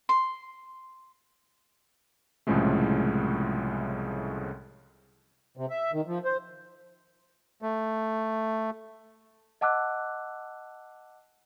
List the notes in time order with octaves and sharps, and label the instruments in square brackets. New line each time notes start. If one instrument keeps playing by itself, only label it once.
[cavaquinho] C6
[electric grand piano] C2 A2 C#3 F3 G#3 A3
[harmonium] C3
E5
D#3
F3
C5
[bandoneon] A3
[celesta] D#5 F#5 A5 D6 E6 F#6